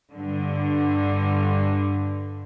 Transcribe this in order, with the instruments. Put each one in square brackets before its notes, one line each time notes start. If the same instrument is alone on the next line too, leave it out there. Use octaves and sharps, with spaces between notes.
[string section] G2 D3